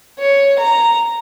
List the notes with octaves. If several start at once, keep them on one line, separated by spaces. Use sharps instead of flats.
C#5
A#5